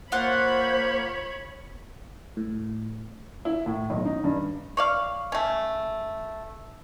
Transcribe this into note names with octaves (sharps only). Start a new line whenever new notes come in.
A#3 F4 C5 C#5 F#5 B5
A2
E4
A2
B1
D#4
G2
C#5 D5 F5
A3 C#4